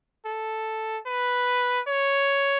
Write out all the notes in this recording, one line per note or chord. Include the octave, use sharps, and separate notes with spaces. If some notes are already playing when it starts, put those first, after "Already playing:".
A4
B4
C#5